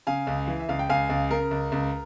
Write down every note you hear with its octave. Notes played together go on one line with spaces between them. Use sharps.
C#3 F5 G#5
C#2
E3
E5
C#2 F5
G5
C#2 F5 G#5
C#2
C#3 A#4
C#2
C#2